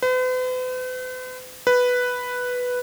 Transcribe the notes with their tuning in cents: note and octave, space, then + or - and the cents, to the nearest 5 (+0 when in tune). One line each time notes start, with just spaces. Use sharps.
B4 +45
B4 +0